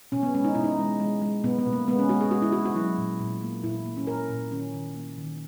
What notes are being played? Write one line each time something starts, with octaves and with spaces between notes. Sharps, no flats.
B2 C#4
B3
G#3 C#4
D#4
B2 E4
D#4
G#3
G#3
G#3
B2 B3
B3
B2
A#3
G#3 B3
C#4
G#3 F#4
G#4
G#3 F#4
E4
G#3 F#4
F#4
F#3 E4
A#2
A#2
A#3
A#2 E4
A#3
C#4
A#2 A#4
A#2
D#3 C#4
D#3
A#3
D#3